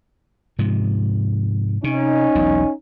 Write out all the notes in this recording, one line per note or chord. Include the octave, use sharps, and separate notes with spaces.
G#2 C3 F3
C3 C#4 D#4
E1 B1 E2